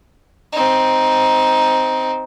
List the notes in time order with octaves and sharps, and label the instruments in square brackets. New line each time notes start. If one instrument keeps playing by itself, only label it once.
[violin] C4 D#4